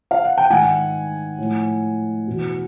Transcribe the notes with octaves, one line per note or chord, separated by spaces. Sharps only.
F5
F#5
G5
G#2 D#3 F#5 G#5
A2 F3
E2 B2